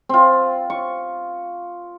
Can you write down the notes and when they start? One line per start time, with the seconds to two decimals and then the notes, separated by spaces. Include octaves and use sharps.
0.09 C4 F4
0.70 C#6